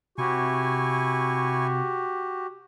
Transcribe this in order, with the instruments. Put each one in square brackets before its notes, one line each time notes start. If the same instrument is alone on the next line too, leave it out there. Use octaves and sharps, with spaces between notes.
[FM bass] C3 [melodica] E4 G#5 C#6 [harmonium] F#4 G4